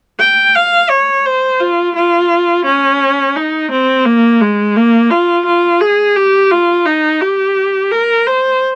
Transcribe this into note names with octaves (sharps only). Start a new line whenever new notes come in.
G5
F5
C#5
C5
F4
F4
C#4
D#4
C4
A#3
G#3
A#3
F4
F4
G#4
G4
F4
D#4
G4
A#4
C5